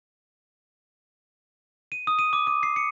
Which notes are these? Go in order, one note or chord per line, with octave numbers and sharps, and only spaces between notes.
D#7
D#6
D#7
D6
D6
C7
C#7